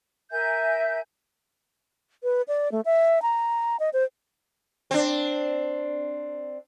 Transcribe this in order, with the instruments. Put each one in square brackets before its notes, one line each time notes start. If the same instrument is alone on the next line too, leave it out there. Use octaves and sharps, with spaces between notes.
[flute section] A#4 E5 G#5 G6
[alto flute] B4
D5
A3
E5
A#5
D#5
C5
[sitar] C4 D4